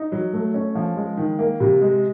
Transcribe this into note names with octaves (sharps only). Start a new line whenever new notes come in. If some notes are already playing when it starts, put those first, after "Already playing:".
Already playing: D#4
F#3
A3
C#4
F3
G#3
D#3
A#3
C3
G#3